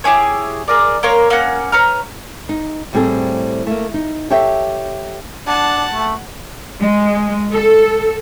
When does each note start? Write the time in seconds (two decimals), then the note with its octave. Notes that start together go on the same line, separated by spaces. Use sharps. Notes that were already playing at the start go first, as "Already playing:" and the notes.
0.04 E4 G4 G#4 C#5
0.68 G#4 A#4 D5
1.03 A#3 A#4 C#5 C6
1.30 A#3 C#4 F#5
1.72 B4 C#5 A#5 F6
2.49 D#4
2.93 A2 G3 B3 C4 G#4 A4
3.67 A3 A#3
3.94 D#4
4.30 G4 A4 C#5 E5 G5
5.47 D4 F#5 A5
5.93 A3
6.80 G#3
7.52 A4